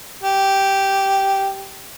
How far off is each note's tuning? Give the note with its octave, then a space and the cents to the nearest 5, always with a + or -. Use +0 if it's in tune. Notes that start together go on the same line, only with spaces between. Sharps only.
G4 -5